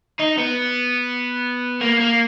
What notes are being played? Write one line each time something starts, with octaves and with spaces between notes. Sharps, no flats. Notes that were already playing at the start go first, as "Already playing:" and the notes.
D#4
B3
A#3
A#3